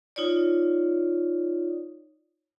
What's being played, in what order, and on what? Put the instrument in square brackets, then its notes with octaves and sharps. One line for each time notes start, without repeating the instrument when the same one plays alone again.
[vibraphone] D#4 F4 C#5 D5